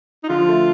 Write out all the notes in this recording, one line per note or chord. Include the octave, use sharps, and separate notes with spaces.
D#4
D3 F4
F3
A3